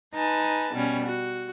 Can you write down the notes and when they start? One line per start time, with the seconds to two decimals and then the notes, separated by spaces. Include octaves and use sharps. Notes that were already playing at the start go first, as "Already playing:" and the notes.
0.14 D#4 B4 G#5 A5
0.74 B2 G3 C#4
1.04 F#4